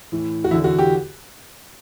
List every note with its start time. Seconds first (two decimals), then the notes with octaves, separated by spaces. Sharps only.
0.12 A2 E3
0.44 F#4
0.51 E2 D3 E4
0.64 F#4
0.79 G4